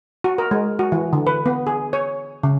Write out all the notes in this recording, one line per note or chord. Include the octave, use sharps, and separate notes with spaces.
F#4
A#4
G#3
F#4
E3
D3
B4
B3
G#4
C#5
C#3